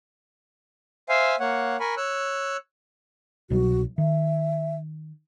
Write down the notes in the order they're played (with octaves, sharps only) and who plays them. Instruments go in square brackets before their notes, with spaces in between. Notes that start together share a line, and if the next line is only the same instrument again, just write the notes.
[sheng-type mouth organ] C5 E5 F5 G#5
A#3 C#5 F#5
A#4 G#5 B5 C#6
C#5 E6 F#6
[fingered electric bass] C2 B2 F#3 [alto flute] F#4
[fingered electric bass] D#3 [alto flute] E5